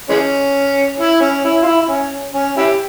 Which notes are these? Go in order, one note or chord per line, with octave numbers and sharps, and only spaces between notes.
E3 G#3 C#4
E4
C#4
E4
F4
E4
E4
C#4
C#4
E4 G4